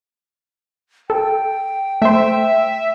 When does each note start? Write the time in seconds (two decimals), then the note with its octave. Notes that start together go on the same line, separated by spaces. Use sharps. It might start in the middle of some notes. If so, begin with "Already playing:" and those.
1.10 A4 G5
2.02 A3 C5 E5